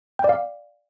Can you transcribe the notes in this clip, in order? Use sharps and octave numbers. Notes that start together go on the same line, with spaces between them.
D5 F5 G5